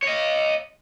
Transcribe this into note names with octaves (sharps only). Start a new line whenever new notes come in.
C#5 D#5